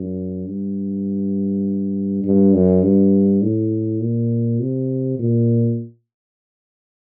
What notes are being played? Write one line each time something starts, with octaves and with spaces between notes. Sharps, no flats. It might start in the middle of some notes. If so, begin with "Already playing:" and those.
Already playing: F#2
G2
G2
F#2
G2
A2
A#2
C3
A#2